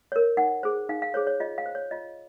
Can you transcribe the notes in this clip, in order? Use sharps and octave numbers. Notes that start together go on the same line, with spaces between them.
A#4 C#5
D#4 F#5
G#4 C5
D#4 F5
F5
G#4 C5 C#5
C#5
F4 D#5
F5
C5
C#5
F4 D#5